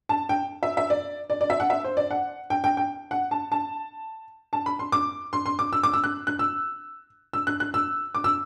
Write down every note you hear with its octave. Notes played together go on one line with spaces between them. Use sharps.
A5
G5
E5
E5
D5
D5
D5
E5
F#5
E5
C5
D5
F#5
G5
G5
G5
F#5
A5
A5
A5
B5
C6
D6
C6
C6
D6
E6
D6
E6
F#6
F#6
E6
E6
F#6
F#6
E6
D6
E6